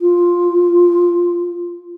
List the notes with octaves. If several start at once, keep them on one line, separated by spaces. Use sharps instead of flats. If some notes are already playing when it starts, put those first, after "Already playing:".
F4